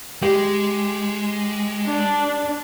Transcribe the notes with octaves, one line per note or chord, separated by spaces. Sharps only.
G#3 G4
D4